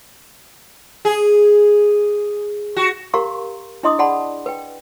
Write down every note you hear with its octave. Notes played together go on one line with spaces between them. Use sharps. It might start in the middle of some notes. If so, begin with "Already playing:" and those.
G#4
F#4
G4 A#4 F5 A#5 C6 C#6
D4 E4 D#5 C6 D6 D#6
G#4 D5 F#5 A5 B5 C6
B4 G5